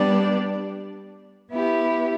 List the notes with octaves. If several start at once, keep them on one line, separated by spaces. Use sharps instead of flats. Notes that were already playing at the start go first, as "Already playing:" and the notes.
Already playing: G3 B3 D4 G4 D5
B3 E4 G4